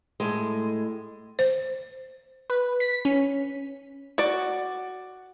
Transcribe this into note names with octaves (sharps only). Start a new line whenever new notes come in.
A2 G#3
C5
B4
B6
C#4
F#4 D5